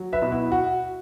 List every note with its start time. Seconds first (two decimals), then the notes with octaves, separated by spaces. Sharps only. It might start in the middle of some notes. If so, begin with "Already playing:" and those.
Already playing: F#3
0.13 B4 E5
0.22 B2
0.32 B3 E4
0.52 F#4